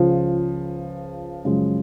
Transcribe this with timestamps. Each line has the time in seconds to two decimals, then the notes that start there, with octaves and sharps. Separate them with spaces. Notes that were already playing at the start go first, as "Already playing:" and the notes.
Already playing: C#2 C#3 F3
1.45 F#2 C#3 F3 G#3